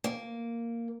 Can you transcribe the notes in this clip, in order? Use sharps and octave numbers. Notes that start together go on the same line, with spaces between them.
A#3